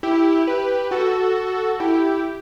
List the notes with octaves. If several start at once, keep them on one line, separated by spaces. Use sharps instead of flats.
E4 G4
G4 B4
F#4 A4
E4 G4